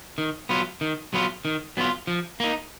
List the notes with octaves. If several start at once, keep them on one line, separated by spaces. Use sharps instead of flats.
D#3
F#3 B3 F4
D#3
F#3 B3 F4
D#3
F#3 B3 F4
F3
A#3 D#4